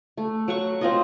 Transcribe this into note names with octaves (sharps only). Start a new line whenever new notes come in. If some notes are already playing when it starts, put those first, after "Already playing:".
A3
F#3 F#5 C#6
C4 F4 D#5